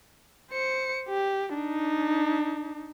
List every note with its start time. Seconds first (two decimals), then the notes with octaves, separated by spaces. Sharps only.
0.51 C5 C#7
1.09 G4
1.55 D4 D#4